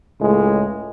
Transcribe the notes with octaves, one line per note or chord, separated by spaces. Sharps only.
C#2 A2 G#3